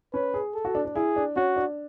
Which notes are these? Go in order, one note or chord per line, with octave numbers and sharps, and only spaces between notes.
C#4 B4
G#4
A4
F#4
D4
D4
E4 G#4
D4
C#4 F#4
D4